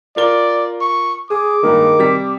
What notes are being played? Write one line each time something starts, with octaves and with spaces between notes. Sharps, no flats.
F4 A#4 D5 G7
C#6
G#4 D6 D#6
G2 D#3 G#3 A#3
C3 G3 B6